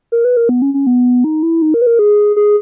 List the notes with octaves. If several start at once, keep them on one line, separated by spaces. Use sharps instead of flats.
A#4
B4
A#4
B3
C#4
C#4
B3
D#4
E4
D#4
A#4
B4
A#4
G#4
G#4